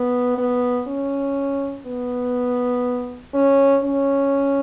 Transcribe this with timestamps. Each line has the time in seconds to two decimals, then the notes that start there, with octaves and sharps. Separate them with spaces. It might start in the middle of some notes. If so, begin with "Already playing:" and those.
Already playing: B3
0.38 B3
0.87 C#4
1.86 B3
3.34 C#4
3.84 C#4